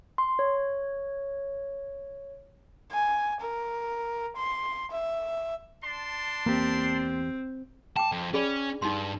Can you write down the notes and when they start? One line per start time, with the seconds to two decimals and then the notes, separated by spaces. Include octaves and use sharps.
0.18 C6
0.39 C#5
2.92 G#5
3.41 A#4
4.36 C6
4.91 E5
5.83 D4 A5 C6
6.46 E2 A#3 C4 G4
7.96 G5 A5 D6
8.12 F2
8.34 C#4 G#4 D5 B5
8.82 G2 D#4 C6